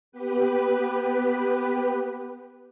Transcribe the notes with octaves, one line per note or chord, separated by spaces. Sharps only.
B3 G4 B4